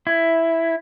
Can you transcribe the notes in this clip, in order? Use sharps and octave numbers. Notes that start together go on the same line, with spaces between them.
E4